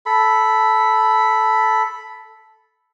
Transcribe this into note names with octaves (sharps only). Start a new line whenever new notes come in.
A4 B5